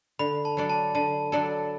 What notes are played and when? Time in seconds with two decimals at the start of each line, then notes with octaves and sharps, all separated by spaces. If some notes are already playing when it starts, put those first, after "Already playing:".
0.19 D3 B5
0.45 A5
0.57 F#3 D4 A4 D5
0.70 A5
0.95 D3 A5
1.32 F#3 D4 A4 D5